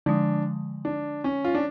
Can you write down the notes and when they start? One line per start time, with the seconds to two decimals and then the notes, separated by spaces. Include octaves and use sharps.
0.06 D3 F3 G#3 D4
0.85 D4
1.24 C#4
1.45 F4
1.55 D4